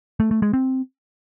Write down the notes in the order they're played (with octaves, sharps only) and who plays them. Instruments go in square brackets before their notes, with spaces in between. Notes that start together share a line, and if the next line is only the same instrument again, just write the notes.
[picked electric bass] A3
A3
G#3
C4